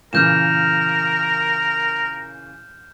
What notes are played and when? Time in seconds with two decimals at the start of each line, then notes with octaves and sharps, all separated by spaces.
0.13 A#2 C#3 E3 A#4 F6 G6 E7